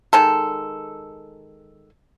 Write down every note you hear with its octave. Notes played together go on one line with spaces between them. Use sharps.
D#3 G#3 A4